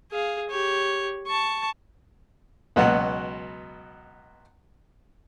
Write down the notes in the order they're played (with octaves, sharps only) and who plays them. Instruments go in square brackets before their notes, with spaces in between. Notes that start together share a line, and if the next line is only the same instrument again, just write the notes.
[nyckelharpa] G#4 F5
G4 C#5
A5 C#6
[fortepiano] C#2 B2 F#3 F#4